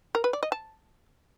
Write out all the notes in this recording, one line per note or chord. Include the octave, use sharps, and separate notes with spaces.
A#4
B4
D5
D#5
A5